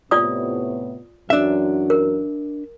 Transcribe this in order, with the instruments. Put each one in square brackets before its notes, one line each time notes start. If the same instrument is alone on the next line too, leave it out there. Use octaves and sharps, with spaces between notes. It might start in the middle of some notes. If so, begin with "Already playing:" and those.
[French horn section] A2 C3 B3 [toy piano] F4 D5 D#6
[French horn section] F#2 E3 F#3 [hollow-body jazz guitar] D4 E5
[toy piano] A#4